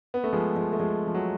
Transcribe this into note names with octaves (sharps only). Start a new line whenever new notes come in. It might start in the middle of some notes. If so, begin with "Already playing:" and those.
B3
A3
F3 G#3
F3 G#3
A3
F3 G#3
F3
F#3